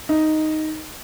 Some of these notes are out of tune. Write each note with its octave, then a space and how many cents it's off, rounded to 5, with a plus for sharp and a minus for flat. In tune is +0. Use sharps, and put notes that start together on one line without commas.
D#4 +0